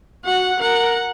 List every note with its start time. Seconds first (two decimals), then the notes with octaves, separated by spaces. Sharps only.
0.25 F#4 F#5
0.61 A#4 F#5